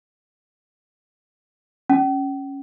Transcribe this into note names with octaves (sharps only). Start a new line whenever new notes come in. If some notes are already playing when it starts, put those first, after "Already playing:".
C#4